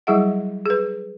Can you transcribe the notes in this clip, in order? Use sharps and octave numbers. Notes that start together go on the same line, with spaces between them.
F#3 G3 E4 G#4 E5 F#5
G#4 B4